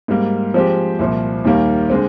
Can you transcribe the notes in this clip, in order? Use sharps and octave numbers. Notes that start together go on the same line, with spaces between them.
G#2 G3 A#3
F3 G#3 C4 G4
C2 A#2 F3
D#2 D#3 G3 A#3
D3 G#3 C4